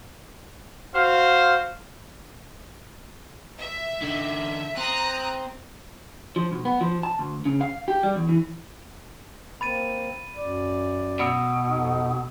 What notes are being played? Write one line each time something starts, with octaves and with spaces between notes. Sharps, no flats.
F#4 C5 F5
E5
D3 D#4
C4 A#5 D#6 F#6
F3
B1
B3
F3
A5
D2
C#3
F5
G4
G3
E2
E3
A#3 C4 B5 A6 D#7
F#2 D5
B2 B5 E6
F2 D#4